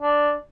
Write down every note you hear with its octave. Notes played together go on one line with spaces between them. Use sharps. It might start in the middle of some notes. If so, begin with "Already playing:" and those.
D4